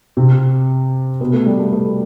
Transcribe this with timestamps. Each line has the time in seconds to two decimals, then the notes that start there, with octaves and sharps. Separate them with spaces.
0.17 C3 C4
1.20 B2 B3
1.33 A3
1.46 G3
1.59 A3
1.73 A3